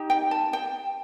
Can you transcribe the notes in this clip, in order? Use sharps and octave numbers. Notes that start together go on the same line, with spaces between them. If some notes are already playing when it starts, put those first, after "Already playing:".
Already playing: D#4 G4
G5
A5
G5